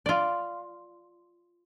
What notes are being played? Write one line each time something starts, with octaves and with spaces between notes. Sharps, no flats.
F4 D5